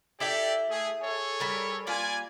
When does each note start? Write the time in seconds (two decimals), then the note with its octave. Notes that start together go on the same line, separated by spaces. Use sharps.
0.20 E4 G4 A4 D5 E5 G5
0.70 A3 G#4
1.01 G#4 A4 C#5
1.40 G3 A#4
1.87 G3 A#3 F4 D5 G#5